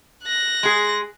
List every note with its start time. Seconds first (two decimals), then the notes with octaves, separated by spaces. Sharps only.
0.23 F#6 A#6
0.63 G#3 G#4